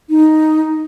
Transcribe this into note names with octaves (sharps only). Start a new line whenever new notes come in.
D#4